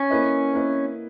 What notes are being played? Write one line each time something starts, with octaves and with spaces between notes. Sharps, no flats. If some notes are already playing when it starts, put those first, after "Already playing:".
Already playing: C#4
A#3 E4 B4 D#5
A#3 E4 B4 D#5